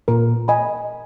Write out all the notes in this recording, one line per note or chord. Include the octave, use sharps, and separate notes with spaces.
A#2 A#4
D#5 G#5 B5